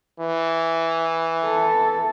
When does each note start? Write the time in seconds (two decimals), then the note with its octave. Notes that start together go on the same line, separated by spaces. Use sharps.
0.19 E3
1.45 A4